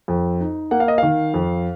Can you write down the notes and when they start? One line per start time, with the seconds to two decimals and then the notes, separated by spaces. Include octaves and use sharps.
0.08 F2
0.41 D#4
0.71 A#3 F#5
0.80 F5
0.88 D#5
0.98 D#3 F5
1.34 F2